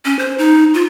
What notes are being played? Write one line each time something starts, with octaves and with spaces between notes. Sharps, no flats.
C#4
C5
D#4
F4